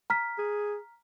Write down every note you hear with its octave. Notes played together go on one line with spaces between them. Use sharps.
A#5 F6 B6
G#4